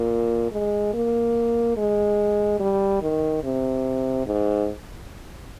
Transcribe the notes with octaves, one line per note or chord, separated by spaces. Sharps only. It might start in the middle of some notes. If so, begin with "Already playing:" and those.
Already playing: A#2
G#3
A#3
G#3
G3
D#3
C3
G#2